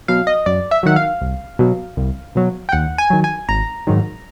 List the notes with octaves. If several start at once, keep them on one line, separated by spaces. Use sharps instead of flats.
B2 F#3 F5
D#5
F#2 D5
E5
D#3 F#3 F#5
F5
C2
B2 F#3
C2
B2 F#3
G5
D#2 F#5
G#5
D#3 F#3
G#5
G#1 A#5
G#2 D#3 F#3